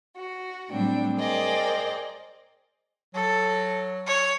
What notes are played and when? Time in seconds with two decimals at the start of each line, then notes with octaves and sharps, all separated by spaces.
0.15 F#4
0.70 A2 F#3 G3 C4 D4 G5
1.17 G#4 A#4 C5 D5 D#5 G5
3.15 F#3 A4
4.07 C#5